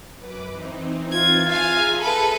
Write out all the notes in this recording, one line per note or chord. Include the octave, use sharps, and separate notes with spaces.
F#2 B4 D6
E3 C4 D#4
F4 G#6
G#4 E5 F5 G#5 A#5
A4 B4